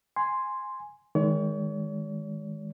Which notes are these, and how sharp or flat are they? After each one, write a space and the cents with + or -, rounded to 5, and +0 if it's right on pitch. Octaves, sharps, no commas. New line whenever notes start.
G#5 +0 C6 +0
D#3 +15 G#3 +0 C#5 +40